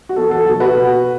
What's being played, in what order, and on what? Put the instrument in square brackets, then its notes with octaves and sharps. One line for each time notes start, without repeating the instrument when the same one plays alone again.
[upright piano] F#4
E2 A4
A4
B2 F#3 F#4
F#4 B4
B2